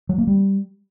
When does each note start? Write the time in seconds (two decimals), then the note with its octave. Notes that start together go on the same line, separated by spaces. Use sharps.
0.09 F#3
0.18 A#3
0.27 G3